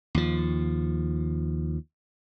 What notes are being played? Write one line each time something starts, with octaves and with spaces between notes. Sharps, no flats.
D#2 F3